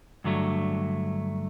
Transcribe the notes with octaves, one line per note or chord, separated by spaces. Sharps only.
G2 D3 F#3 A3